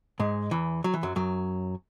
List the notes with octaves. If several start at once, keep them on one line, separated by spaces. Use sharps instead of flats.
G#2 G#3
E2 E3
F#3
E3
F#2 F#3
F#2 F#3